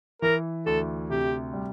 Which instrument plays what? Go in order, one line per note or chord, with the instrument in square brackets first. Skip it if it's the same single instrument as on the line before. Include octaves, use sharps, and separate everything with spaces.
[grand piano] E3 [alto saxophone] A#4
[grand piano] D2 [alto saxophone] A4
[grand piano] C3 [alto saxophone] G4
[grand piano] G3